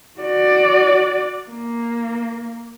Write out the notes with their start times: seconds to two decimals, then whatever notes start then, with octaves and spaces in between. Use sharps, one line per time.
0.20 F#4 D5
1.49 A#3